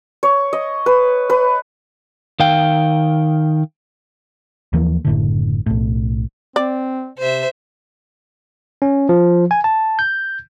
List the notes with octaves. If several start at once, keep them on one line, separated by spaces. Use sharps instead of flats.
C#5
D#5
B4
B4
D#3 F5 G5
D#2 E3 F3 A#3
F#1 A2 D3
B1 A2
C4 D5
C3 C5 E5
C#4
F3
G#5
A5
G6